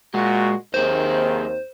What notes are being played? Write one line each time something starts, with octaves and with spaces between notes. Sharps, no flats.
A#2 G#3 F#4
D#2 D#3 A#3 C4 G#4 C5